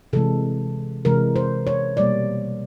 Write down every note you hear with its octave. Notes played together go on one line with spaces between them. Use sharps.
C3 E3 G#3 A4
C3 E3 G#3 A#4
C5
C#5
B2 G3 A#3 D5